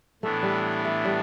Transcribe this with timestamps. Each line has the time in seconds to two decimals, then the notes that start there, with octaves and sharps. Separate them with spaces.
0.22 A2 E3 A3 B3 D4
0.43 G3
0.85 A3
1.05 G3